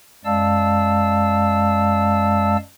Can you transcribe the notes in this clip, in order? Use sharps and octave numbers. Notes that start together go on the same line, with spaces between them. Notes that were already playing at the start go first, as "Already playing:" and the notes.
F#2 G#3 D5 F5 A5 E6